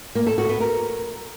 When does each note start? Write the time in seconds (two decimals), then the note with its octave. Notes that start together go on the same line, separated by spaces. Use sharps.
0.15 A#3
0.27 A4
0.38 F#4
0.49 B3
0.60 A#4